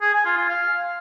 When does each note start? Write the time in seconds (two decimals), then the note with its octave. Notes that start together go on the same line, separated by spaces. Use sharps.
0.02 G#4
0.14 G#5
0.25 F4
0.37 F4
0.49 F5